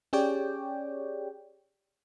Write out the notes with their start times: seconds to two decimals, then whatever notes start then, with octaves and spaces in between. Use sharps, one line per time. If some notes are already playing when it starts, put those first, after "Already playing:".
0.13 C#4 G4 G#4 C#5 D5 G5